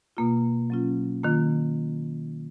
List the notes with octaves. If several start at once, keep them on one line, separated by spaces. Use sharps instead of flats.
B2 A#3 F4
F#3 C#4 F4
D#3 A#3 F4